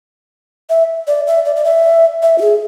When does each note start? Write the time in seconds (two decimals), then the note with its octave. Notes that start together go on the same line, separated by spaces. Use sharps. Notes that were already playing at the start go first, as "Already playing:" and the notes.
0.69 E5
1.07 D5
1.27 E5
1.45 D5
1.56 D5
1.65 E5
2.22 E5
2.38 F4
2.41 G#4